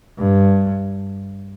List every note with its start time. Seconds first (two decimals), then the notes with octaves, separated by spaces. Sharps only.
0.18 G2